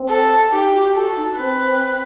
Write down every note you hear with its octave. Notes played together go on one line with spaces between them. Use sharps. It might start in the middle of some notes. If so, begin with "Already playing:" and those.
Already playing: C4
A4
D#4 G4
F#4
G4
F#4 A4
D#4
D#4
C4 B4